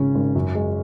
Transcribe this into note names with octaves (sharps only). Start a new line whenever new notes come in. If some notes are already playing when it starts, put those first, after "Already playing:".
Already playing: G#1 C#3 C#4
G#1
F#2
G#3